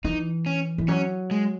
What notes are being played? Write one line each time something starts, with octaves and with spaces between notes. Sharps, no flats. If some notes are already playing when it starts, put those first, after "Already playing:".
E3 D#4
C#4
E3
F#3 C#4
G#3